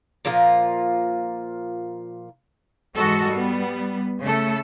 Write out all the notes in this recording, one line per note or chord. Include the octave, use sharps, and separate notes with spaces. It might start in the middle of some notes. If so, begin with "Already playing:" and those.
A#2 F3 F4 A#4
G#2 E3 G#3 F#4 A4 D#5
G3 B3
C#3 A3 A4